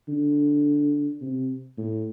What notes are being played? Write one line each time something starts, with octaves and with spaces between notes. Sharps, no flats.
D3
C3
A2